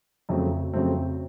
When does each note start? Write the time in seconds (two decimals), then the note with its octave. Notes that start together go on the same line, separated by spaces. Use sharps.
0.29 F2 C#3 F#3 A3 C4
0.73 F2 C#3 F#3 A3 C4